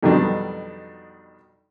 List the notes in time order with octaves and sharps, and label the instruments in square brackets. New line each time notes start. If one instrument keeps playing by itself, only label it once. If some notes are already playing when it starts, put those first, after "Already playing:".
[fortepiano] F2 B2 D#3 F#3 G3 D4